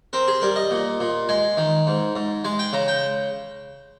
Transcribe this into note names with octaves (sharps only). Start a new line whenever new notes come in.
C4 A#4
G#4
G3 A#4
D#5
A#2
A#2
G#3 G#5
D#3
G#2
G#2
G#3 G#5
G5
C#3 A#5
G5